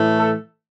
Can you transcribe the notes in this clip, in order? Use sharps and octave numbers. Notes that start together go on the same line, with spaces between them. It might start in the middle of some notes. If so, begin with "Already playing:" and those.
Already playing: A2 E3 A3
A4